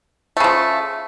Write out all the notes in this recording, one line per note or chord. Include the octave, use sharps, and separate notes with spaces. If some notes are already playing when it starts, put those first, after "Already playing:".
C#3 F3 A3